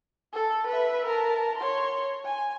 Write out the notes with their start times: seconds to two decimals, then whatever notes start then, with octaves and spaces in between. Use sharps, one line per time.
0.33 A4
0.67 B4 E5
1.06 A#4 A5
1.57 C#5 C6
2.24 G#5